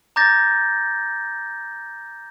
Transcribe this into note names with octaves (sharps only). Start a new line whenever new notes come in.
A#5 D6 G6 A6 A#6